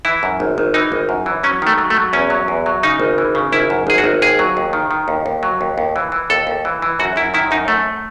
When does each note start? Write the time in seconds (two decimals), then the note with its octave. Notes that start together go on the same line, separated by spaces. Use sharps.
0.05 E3 E4
0.23 F#2
0.40 G#1
0.58 G#1
0.74 E3 D#4
0.92 G#1
1.09 F#2
1.26 E3
1.43 F#3 C#4
1.62 D#3 A3
1.78 F#3
1.90 A3
1.97 F#3
2.13 E2 C#4
2.30 F#3
2.48 E2
2.66 F#3
2.83 C#3 D#4
3.00 G#1
3.18 E3
3.35 C#3
3.52 G#1 E4
3.70 F#2
3.87 G#1 G#4
3.98 F#4
4.04 G#1
4.22 D#2 G#4
4.39 F#3
4.57 D#2
4.73 D#3
4.91 D#3
5.08 D#2
5.26 D#2
5.43 F#3
5.61 D#2
5.78 D#2
5.96 E3
6.12 E3
6.30 D#2 A4
6.47 D#2
6.65 E3
6.82 E3
6.99 F#2 F#4
7.16 F#2 E4
7.34 D#3 E4
7.51 F#2 D#4
7.68 F#2 A3